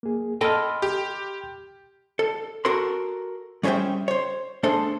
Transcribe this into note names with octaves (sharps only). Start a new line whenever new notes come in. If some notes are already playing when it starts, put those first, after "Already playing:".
A#3 G#4
A4 D#5 G5 B5 C6 F6
G4
A4
F#4 A4 A#4 C6
G3 C#4 G#4 C5 E5 G5
C5 C#5
A3 D4 G#4 A4 C5